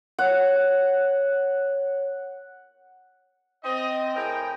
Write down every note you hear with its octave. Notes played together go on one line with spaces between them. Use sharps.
C#5 F#5
C4 D#5
A2 G#4 A#4 G5